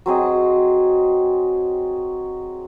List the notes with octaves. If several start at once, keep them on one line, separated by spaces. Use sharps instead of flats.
F#3 C4 G#4 D#5